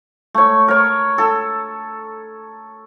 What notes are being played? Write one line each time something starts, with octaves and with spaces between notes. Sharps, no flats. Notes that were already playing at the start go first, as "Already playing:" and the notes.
A3 C#5
A#4 C#5
A4